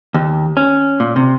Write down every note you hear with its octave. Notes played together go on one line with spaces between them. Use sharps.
D#2
C#4
A#2
C3